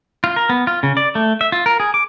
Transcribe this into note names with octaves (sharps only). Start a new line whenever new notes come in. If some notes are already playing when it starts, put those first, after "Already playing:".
F4
A#4
B3
F4
C#3
D5
A3
E5
F4
A#4
G#4
D6